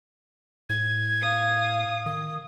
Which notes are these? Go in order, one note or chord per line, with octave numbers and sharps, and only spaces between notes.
A2 G#6
F5 D#6
D#3 D#6